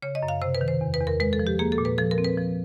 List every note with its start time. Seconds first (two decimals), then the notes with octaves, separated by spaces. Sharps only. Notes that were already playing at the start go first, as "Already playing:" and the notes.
0.02 C#3 C#5
0.15 D#5
0.23 F#2
0.28 F5
0.42 C3 C5
0.55 B4
0.61 D#3
0.68 C5
0.81 E2
0.94 B4
1.00 E2
1.07 A#4
1.20 G#3 B4
1.33 A4
1.39 F3
1.47 G4
1.59 A#3 G#4
1.72 A4
1.78 A#2
1.85 B4
1.98 F3 A4
2.11 A#4
2.18 C4
2.24 B4
2.37 F3